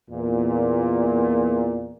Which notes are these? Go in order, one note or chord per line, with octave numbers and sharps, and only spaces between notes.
E2 A#2